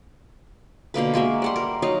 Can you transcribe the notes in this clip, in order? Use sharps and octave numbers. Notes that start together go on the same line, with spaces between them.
B2 D3 A#3 B4
G#3 A#3 F#4 E5
G3 F#5 C6
A#4
F#3 D#4 D#5 F5